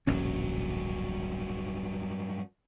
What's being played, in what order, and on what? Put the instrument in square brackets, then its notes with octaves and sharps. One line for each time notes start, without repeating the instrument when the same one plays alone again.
[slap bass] D1 A#1 C#4 [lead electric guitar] G2 F#3